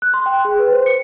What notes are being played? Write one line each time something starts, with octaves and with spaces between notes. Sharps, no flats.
F#6
C6
G5
G#4
B4
C5
C#7